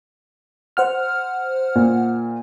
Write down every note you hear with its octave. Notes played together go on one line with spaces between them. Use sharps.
C5 F#5 F6
A#2